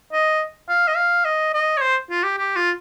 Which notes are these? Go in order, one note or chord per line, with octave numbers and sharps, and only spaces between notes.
D#5
F5
D#5
F5
D#5
D#5
C#5
C5
F4
G4
G4
F4